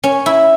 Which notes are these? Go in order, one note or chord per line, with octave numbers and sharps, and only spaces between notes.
C#4
E4